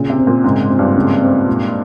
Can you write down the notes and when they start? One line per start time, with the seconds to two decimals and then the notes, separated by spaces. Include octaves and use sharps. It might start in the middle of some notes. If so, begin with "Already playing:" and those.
Already playing: A#2 C#3
0.10 C3
0.18 C4
0.27 A#2
0.44 G#2 C#3
0.61 G#2
0.70 C4
0.79 G2
0.96 C#3
1.22 C4
1.47 A#2